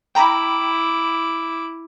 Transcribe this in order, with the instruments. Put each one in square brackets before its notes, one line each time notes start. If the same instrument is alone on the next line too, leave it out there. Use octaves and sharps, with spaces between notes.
[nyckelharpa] E4 D6 [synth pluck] G5 A#5 B5